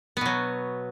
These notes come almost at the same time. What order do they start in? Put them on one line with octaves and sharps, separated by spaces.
B3 B2 F#3